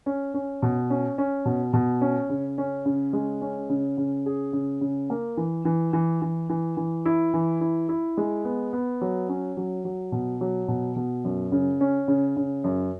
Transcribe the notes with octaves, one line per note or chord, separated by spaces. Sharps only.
C#4
C#4
B2
C#4
C#4
B2
B2
C#4
C#3
C#4
C#3
G#3
C#4
C#3
C#3
G#4
C#3
C#3
A#3
E3
E3
E3
E3
E3
E3
E4
E3
E4
E4
G#3
B3
B3
F#3
C#4
F#3
F#3
B2
F#3
B2
B2
F#2
C#3
C#4
C#3
C#3
F#2